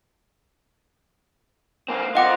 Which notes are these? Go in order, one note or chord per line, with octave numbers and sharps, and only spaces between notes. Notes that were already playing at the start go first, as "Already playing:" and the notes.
A#3 C4
C4 F4 D#5 F#5 D6